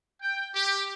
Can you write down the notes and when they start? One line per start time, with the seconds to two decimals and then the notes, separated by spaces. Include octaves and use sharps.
0.21 G5
0.54 G4